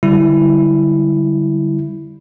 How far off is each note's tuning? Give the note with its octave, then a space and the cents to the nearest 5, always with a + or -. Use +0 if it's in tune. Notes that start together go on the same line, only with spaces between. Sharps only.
D3 +0 G3 -10 E4 +0